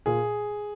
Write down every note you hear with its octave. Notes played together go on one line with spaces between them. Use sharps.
A#2 G#4